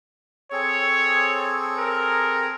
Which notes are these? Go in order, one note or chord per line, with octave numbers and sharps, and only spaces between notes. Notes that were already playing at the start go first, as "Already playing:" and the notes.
C4 G#4 A4 C#5
A#4